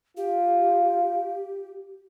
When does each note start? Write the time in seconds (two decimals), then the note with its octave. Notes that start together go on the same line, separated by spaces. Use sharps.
0.17 F4 G4